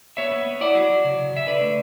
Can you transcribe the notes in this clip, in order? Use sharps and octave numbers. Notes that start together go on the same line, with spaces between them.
B3 C#5 E5
B3
B3
E4 D5 F#5
F#3
F#3
C#3
C#3
C#3 E5
D3 B4 D5
A3